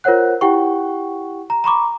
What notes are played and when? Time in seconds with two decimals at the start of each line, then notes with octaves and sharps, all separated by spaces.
0.04 F4 A#4 C5 C#5 F#5 F#6
0.41 E4 G4 F#5 G5 C#6
1.50 A#5
1.64 A#5 B5 C#6 D6